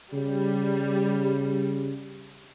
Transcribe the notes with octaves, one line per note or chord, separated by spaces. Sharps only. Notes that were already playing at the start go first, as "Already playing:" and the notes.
C#3 G3